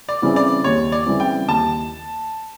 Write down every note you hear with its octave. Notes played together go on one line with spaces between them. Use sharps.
D5
C#3 E3 G3 C4
D5
D#2 C#5
D5
C#3 E3 G3 C4
G5
D#2 A5